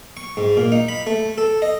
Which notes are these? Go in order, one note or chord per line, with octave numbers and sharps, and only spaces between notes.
C#6
G#2
A#2
D#4
B5
A3
A4
D#5